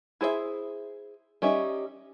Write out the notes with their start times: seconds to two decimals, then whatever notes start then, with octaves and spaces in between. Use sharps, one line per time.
0.21 E4 G#4 C5 C#5 E5
1.42 G3 C#4 D#4 E5